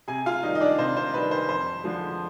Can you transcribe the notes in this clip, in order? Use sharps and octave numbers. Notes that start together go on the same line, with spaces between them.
C3 G#4 G#5
F4 F5
D#3 G3 D#4 D#5
D#5
D4 D5
C3 C5
C5
D#3 G3 B4
C5
F2 C5
D3 F3 G#3